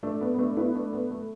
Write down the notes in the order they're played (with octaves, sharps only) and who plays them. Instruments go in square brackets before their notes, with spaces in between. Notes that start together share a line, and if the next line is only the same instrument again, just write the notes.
[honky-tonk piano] A3 D4
B3
B3
A3 D4
B3 E4
A3 D4
B3
A3